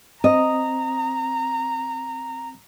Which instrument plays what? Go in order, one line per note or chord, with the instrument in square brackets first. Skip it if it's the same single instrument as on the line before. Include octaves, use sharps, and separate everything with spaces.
[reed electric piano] C4 D#6 [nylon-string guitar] D#5 [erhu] A#5